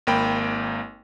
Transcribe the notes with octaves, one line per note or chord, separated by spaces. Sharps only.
G#1 A#3 G5 B5